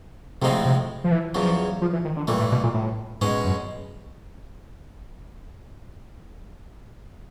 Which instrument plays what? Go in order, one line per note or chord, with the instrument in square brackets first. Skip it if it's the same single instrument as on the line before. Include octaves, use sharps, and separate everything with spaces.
[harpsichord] A2 F3 G#3 C4 D#4 [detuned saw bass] C3
[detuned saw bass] C3
F3
E3
[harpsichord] E2 C#3 F#3 [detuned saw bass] F3
[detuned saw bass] F3
E3
D#3
D3
[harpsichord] G2 E3 A3 [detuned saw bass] A#2
[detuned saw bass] A2
B2
A#2
A2
[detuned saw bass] G#2 [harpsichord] B2 G#3 C#4
[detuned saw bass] F#2